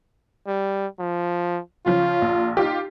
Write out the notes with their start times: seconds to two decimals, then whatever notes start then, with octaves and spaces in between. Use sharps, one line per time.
0.47 G3
0.99 F3
1.86 C#3 F3 F4
2.22 A#1
2.57 D#4 F4 G4